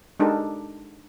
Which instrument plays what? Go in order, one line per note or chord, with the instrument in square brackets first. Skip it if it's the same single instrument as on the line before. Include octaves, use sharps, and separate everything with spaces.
[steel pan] G#3 D4 D#4 G4 A4 A#4